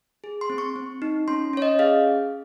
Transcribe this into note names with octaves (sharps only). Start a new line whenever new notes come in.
G#4
C6
C4
C#6
C4
D#4
C#4 C6
C#4 C#5
D#5
G#4 F5